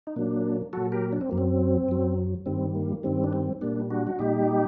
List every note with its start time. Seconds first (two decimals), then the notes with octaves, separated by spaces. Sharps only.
0.07 D#4
0.16 A#2 F#3 A#3 D4
0.73 A#2 F#3 F#4 A4
0.92 G4 A#4
1.13 D4
1.21 C4
1.29 F#2 F#3 A#3
1.38 C4
1.89 F#2 F#3
2.46 G2 D#3 G3 C4
2.75 A#3
3.03 G2 D#3 G3 C4
3.24 D4
3.33 C4
3.61 A#2 G3 A#3 D4
3.90 D4 F#4
4.07 F#4
4.19 A#2 G3 D#4 G4